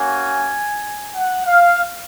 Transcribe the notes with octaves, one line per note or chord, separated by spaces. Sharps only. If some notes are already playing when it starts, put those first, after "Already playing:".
Already playing: A#3 C#4 F#4 G#5
F#5
F5